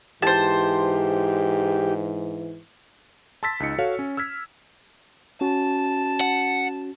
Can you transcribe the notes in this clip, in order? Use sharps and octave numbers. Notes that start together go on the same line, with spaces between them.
G#2 E3 G4 C5 A5
A5 C6 E6 A6 B6
C#2 D#4 C#7
F#4 A4 C#5 F5
C#4
E6 F6 G#6 B6
C#4 F#4 A5
F#5